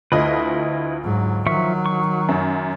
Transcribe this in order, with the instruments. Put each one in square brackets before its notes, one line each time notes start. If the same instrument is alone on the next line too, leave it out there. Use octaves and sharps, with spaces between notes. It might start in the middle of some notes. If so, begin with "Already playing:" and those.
[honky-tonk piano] D2 F4 D#5 [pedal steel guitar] E4 B4
[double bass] G#2 F#3
[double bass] D#3 F#3 [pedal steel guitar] F3 E5 C#6
[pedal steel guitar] C#6
[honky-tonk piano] F#2